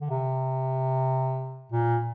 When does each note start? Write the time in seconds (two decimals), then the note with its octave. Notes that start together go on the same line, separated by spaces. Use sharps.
0.01 D3
0.10 C3
1.72 A#2